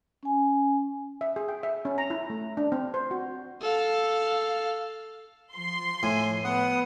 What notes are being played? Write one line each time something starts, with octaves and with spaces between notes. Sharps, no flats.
C#4 G#5
E5
G#4
G5
E5
C#4
A#5
E4
A3
D4
C4
C5
F#4
A4 F5
F3 C6
A2 G#5
B3 F#5 D#6